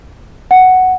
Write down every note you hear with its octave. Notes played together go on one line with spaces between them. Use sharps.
F#5